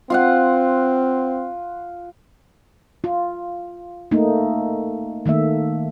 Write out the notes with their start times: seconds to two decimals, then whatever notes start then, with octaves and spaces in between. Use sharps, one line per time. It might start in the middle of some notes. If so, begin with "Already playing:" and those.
0.10 C4 F4 F5 F#5
3.04 F4
4.11 A3 A#3 D#4
5.26 D#3 A3 A#3 E5